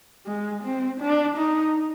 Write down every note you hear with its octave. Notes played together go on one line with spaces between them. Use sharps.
G#3
C4
D4
D#4